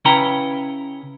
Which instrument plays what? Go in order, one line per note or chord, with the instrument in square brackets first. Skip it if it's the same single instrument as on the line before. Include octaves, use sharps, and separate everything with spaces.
[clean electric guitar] C#3 C#4 E4 B4 G5 A#5